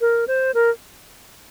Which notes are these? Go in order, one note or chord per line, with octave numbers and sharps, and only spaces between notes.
A#4
C5
A#4